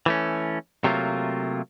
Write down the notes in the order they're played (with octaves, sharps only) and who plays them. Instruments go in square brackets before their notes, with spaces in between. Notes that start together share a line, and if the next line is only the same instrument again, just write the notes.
[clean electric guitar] E3 A3 C#4
C3 F#3 A3 A#3 F4